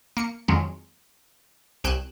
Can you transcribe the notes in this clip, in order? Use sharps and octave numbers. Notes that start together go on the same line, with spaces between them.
A#3 C#7
F2 D#3 F3 F#3 G#3 C#4
C2 G5 G#5 F#6 E7